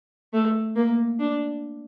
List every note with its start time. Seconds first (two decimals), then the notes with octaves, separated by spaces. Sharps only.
0.33 A3
0.76 A#3
1.19 D4